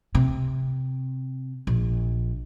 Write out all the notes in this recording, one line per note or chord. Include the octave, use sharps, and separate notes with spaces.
C3
A#1